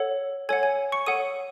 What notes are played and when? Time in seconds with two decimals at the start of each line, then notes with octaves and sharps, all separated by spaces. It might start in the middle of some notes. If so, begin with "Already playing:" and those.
Already playing: A4 C#5 F#5
0.49 A4 C#5 F#5 G#5 G#6
0.63 G#5 G#6
0.92 C#6 C#7
1.06 A4 C#5 F#5 D#6 D#7